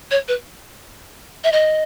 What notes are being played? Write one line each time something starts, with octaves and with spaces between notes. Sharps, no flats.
C#5
B4
E5
D#5